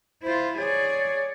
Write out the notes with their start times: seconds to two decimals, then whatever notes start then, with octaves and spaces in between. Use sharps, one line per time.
0.23 E4 F4 C5
0.58 G#4 C#5 D5